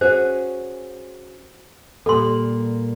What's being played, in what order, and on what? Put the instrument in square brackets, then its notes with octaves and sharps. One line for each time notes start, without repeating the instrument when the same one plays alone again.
[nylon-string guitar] C#4 F#4 G#4 [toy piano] C5
[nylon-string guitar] A#2 G3 A#3 [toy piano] A4 C6